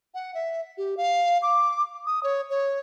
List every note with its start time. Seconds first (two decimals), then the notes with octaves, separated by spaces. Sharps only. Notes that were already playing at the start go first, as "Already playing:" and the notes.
0.14 F#5
0.35 E5
0.78 G4
0.97 F5
1.42 D6
2.06 D#6
2.23 C#5
2.50 C#5